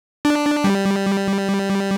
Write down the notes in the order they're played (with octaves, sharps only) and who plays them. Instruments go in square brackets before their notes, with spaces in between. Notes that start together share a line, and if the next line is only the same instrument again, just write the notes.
[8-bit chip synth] D4
G3